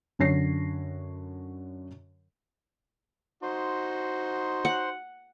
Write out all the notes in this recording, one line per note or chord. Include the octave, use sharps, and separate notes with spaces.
F#2 D3 C#5 A#6 C7
D#4 F#4 C5 C6
F#5